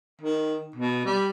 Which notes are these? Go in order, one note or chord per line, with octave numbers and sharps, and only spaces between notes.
D#3
B2
G3